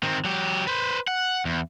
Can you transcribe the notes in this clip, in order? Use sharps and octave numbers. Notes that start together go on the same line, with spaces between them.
D#3 C4
F#3 G4
B4 C5
F#5
E2